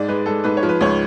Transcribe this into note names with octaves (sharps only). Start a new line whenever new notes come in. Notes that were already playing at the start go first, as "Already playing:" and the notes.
Already playing: G#2 D5
G#3 B4
G#3 A4
G#2 B4
C#5
F3
B4
C#2 C#5